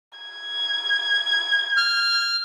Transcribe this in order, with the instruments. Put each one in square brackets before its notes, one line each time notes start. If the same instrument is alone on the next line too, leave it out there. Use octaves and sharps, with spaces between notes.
[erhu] G#6
[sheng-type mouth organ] F6